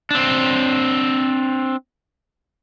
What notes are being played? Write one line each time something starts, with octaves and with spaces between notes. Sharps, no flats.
C4 D4